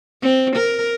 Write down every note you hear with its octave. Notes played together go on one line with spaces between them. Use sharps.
C4
A#4